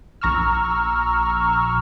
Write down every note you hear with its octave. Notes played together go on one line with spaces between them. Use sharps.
A#1 A#5 C#6 E6 F6